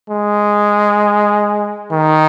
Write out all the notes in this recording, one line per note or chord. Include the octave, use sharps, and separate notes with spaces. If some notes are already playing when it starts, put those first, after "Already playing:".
G#3
D#3